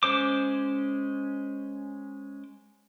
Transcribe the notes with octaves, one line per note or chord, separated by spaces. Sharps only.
G#3 C#4 C5 D6